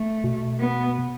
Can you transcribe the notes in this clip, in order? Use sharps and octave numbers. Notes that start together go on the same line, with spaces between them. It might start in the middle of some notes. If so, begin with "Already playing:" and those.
Already playing: A3
B2
B3